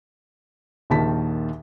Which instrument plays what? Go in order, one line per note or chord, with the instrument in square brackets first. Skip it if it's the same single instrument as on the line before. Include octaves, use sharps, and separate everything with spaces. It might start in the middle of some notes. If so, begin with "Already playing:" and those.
[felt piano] A#1 D#2 D#3 A5 B6